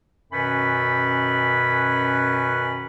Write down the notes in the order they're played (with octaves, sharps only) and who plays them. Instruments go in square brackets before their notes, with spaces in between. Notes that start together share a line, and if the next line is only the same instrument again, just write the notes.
[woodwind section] F#2 B2 D#3 C#4 B4 B5